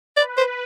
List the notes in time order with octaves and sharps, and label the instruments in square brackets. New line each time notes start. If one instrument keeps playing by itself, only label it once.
[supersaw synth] B4 [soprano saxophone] D5
[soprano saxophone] C5